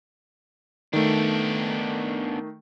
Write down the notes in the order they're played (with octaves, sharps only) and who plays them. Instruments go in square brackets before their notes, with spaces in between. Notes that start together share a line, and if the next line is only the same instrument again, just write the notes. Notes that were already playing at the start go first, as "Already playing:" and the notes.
[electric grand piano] D#3 A3 [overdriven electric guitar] B3 D4